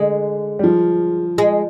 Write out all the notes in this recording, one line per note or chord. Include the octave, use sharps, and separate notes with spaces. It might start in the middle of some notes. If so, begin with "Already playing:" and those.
Already playing: D3 G#3
G3
F3
G#3